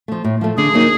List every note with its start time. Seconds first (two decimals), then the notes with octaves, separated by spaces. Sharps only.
0.08 F3 A3
0.24 A2
0.41 F3 A3
0.57 D3 G#4
0.73 F#3 A#3 D#4